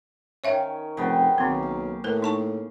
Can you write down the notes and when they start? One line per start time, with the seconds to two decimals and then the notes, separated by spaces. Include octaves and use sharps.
0.44 D#3 C#4 C#5 E5 F5
0.97 F1 C#3 B3 G5
1.38 B1 D#3 A#3 C4
1.63 F5
2.04 A2 A#4 B4
2.22 D#4 A5 C#6